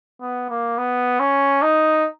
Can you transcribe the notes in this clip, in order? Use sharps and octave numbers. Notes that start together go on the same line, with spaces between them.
B3
A#3
B3
C#4
D#4